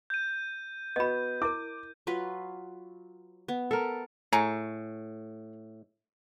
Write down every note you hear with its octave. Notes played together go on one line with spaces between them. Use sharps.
G6 D#7
B3 F#4 D#5 B5
E4 A#4 D6
F#3 F4 B4
B3
A4 A#4 E5
A2 G#4 A#5 C#6